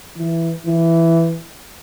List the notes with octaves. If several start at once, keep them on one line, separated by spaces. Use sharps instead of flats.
E3
E3